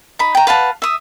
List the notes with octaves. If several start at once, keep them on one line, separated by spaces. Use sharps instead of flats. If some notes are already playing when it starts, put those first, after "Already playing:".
D#4 B5
G5 A#5
B4 F5 F#5 A5
E5 D#6